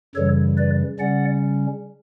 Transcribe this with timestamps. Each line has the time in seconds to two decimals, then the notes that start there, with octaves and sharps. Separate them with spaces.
0.15 F#2 C#3 E3 G3 A4 C#5
0.57 B4 D5
0.99 C#3 G3 C#4 D5 F#5